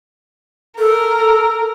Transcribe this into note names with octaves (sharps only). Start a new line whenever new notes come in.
A4 A#4